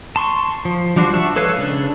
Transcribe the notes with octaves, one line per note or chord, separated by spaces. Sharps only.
A5 C6 C#6
F3
F3 G3 D4 F#4 C5
E5 F#5 A5 C#6
G#3 A4 B4 C#5 F5
C#3 D4